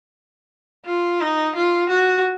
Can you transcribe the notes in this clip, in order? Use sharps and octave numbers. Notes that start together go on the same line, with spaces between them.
F4
D#4
F4
F#4